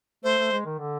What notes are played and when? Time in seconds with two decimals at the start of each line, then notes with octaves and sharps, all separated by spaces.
0.24 A3 C5
0.38 A3
0.51 G#3
0.65 D#3
0.79 D3